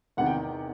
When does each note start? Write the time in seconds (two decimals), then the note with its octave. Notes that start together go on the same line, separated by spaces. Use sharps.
0.17 E2 C3 D#3 F#5
0.26 G5